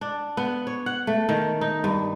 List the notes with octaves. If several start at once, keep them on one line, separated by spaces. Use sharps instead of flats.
D4
B3
C#5
F#5
A3
D#3
D#4
G2